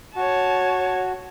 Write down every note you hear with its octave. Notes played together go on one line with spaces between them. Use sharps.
F#4 C#5 A5